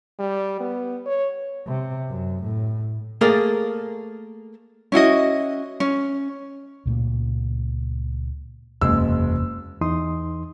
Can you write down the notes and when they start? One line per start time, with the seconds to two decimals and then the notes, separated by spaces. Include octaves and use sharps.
0.19 G3
0.60 B3
1.06 C#5
1.67 C3
2.09 F#2
2.43 A2
3.21 A3 A#3 G#4 A#4 D5
4.92 C#4 E4 F#4 D#5
5.80 C#4
6.86 C#2 A#2 A3
8.81 F#1 E2 C3 G#3 C#4 E6
9.81 E2 E3 D#4 C6 D#6